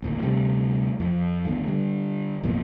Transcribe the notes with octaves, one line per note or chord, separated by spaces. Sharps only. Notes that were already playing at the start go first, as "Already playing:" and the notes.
G#1 D2 A#2
D2 C3 G3 A3
F2 F3
G#1 D2 A3 B3
D3 G3
A1 F2 B2 A#3